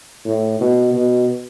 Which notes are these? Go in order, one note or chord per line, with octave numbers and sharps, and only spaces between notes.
A2
B2
B2